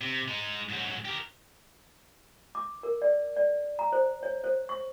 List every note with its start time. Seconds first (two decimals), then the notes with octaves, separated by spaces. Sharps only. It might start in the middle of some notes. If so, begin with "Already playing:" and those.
0.01 C3
0.28 G#3 D#4
0.69 G#2 F#3
1.05 G4 A#4
2.55 D6
2.83 A#4
3.02 D5
3.37 D5
3.79 A#5
3.92 C5
4.23 C#5
4.44 C5
4.69 C#6